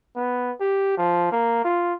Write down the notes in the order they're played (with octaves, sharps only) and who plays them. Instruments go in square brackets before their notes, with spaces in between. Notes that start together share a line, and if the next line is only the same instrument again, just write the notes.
[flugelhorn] B3
G4
F3
A#3
F4